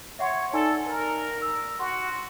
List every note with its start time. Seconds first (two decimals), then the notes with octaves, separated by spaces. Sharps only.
0.19 C#5 E5 F#5 C6
0.53 D#4 A4 D5 G#5
0.87 A#4
1.42 E6
1.80 F#4 C6